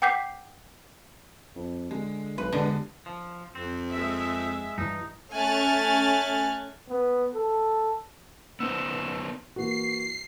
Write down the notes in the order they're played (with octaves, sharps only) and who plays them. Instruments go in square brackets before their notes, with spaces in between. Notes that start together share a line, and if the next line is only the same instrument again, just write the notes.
[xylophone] F#5 G5 D6 G6 B6 C7
[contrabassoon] F2
[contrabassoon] D3 [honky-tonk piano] G#3
[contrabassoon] B1 [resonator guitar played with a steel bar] B4
[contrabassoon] E1 [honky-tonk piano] G2 G#3 B3 [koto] D3
[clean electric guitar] F3
[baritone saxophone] F2 [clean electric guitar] C4
[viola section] G#3 E5
[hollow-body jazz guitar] G2 E3 [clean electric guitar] D#4
[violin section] A3 C#4 G#5 F6 F#6 A6
[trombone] B3
A4
[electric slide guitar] B3 D#4 C5 [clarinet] E6
[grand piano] E3 A#3 F#4 [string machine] C7